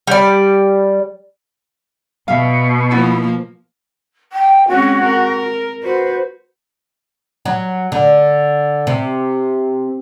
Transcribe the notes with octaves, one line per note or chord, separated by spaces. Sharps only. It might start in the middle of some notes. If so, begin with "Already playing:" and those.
G3 D5
B2 E5 F5
F3 A#3 B3 E4
G5
G#3 C4 C#4 F#4
A#4
F#4 B4 C5
F#3
D3
C3